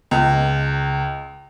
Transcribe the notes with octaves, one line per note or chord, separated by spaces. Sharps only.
C#2